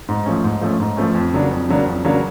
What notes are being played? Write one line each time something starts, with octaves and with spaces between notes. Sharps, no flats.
G#2
F3 A3 C#4
G#2
F3 A3 C#4
G#2
F3 A3 C#4
F2
C#3 F#3 A#3 D4
F2
C#3 F#3 A#3 D4
F2
C#3 F#3 A#3 D4